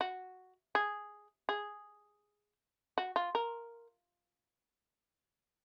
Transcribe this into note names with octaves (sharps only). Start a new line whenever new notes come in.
F#4
G#4
G#4
F#4
F4
A#4